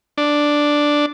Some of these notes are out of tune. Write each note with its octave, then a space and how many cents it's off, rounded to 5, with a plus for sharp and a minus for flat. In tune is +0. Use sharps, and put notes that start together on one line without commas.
D4 +0